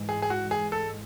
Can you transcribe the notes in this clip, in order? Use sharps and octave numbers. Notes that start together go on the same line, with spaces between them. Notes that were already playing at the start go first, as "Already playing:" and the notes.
Already playing: G#2 E3 G#3
G#4
G#4
F#4
G#4
A4